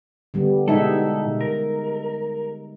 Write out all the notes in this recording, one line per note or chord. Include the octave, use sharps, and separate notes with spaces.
D3 G3 B3
B2 G#3 D#4 E4 A4 E5
A#4